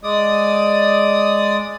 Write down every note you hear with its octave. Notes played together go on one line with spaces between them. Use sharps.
G#3 D5 D#6